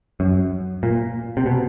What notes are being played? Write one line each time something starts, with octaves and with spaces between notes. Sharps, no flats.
F#2
A#2
C3
B2